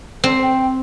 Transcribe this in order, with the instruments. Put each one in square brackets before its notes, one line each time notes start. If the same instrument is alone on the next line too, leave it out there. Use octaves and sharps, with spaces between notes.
[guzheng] C4
[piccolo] G5